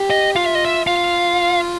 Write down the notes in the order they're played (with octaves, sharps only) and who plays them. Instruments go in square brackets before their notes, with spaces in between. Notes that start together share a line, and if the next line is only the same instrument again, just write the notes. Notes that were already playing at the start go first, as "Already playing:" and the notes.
Already playing: [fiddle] G4
[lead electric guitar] D#5
[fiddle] F4 [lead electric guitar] F5
[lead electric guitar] E5
D#5
E5
[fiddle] F4 [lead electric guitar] F5